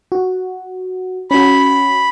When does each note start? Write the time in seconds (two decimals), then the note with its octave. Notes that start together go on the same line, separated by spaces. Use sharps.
0.12 F#4
1.31 C#4 F#4 B5